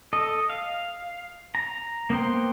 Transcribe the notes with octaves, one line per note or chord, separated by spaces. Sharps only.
A4 D#5
F5
A#5
A#3 B3 C5 G5